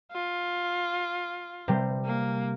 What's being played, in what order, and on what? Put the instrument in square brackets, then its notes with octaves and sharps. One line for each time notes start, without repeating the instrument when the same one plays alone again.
[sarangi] F4
[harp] C3 G3 C5
[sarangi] A#3